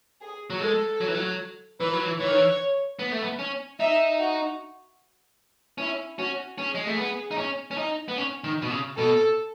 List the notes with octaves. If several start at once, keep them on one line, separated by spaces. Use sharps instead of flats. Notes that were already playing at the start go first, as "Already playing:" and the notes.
G#4
F#3
G#3 A4
F#3
E3
F#3
E3 B4
F#3
E3
E3 C#5
D#3
E3
B3
A3
B3
C#4
D#4 E5
F#4
C#4 E4
C#4 F#4
C#4 G#4
G#3
A3
B3
D#4
C#4
C#4
D#4
B3
C#4
D#3
B2
C#3
B2 A4